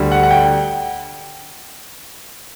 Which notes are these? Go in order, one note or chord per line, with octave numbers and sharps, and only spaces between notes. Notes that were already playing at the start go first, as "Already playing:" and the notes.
Already playing: D2 D3 G3
F#5
F#5
G5